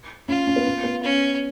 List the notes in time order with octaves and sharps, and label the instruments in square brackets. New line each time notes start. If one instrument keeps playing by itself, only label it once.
[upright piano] C#4 [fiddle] F4
[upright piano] C#4
B3
C#4
B3
[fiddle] C#4